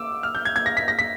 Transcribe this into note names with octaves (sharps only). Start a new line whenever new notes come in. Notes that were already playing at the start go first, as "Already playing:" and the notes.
Already playing: D6 E6
F6
G6
G#6
G#6
A#6
B6
A#6
B6